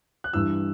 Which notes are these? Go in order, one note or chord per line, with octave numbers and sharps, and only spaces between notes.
F#6
G2 E3 E6